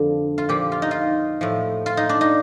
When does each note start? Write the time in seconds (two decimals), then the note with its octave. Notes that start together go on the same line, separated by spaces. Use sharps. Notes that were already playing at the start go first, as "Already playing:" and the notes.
Already playing: F2 D3 F3 A4
0.38 F4
0.49 A#2 F3 G4
0.72 F4
0.82 D#4
0.91 F4
1.41 A2 F3
1.86 F4
1.97 D#4
2.09 D4
2.21 D#4